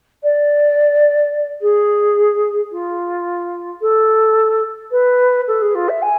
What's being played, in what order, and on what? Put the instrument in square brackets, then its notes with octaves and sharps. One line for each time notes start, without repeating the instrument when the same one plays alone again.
[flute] D5
G#4
F4
A4
B4
A4
G#4
F4
E5
G#5